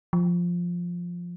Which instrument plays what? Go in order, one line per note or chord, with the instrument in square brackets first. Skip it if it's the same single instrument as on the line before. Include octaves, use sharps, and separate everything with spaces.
[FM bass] F3